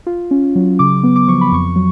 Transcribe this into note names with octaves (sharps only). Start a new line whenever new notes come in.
F4
C#4
F#3
C#3 D6
B3
D6
F3 C#6
B5
F2 C#6
F#3